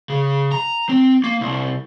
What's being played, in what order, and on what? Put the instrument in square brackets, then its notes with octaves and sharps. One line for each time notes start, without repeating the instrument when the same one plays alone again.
[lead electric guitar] C#3
A#5
C4
A#3
C2